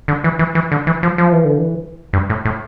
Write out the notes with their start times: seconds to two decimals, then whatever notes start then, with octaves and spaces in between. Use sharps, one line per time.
0.08 D3
0.24 E3
0.39 E3
0.55 E3
0.72 D3
0.87 E3
1.03 F3
1.18 F3
1.33 E3
1.45 D3
1.58 E3
2.13 G2
2.30 A2
2.45 A2